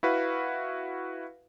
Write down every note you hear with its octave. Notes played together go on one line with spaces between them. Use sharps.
E4 F#4 B4 F5